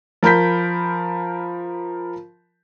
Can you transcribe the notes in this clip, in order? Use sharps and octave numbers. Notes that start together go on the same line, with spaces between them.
F3 A#4 B5 G6 B6